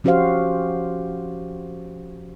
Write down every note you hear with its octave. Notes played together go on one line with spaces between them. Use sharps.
F3 C#4 F#4 G4 C5 F5